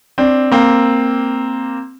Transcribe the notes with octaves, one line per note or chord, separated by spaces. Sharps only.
C4 D4
A#3 C4